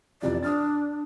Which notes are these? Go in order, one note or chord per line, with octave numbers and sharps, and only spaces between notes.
F2 C3 E3 D5
D4 D#6 F6 A6